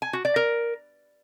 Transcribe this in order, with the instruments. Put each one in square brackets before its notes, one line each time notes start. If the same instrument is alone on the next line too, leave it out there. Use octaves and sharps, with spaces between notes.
[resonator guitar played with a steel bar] G#5
F#4
D5
A#4